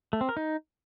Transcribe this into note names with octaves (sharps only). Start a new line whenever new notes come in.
A3
C4
A#4
D#4